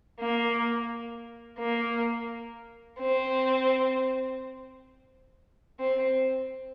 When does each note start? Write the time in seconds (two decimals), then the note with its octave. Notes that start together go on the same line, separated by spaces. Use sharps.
0.20 A#3
1.59 A#3
2.99 C4
5.80 C4